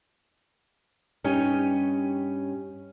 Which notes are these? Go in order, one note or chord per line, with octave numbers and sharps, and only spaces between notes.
G2 C#4 D#4 G4 C#5 G#5